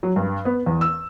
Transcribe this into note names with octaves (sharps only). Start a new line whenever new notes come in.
F#3
G2
B3
E2
E6